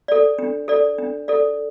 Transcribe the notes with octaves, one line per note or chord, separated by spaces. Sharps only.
A4 D5
D4
A4 D5
D4
A4 D5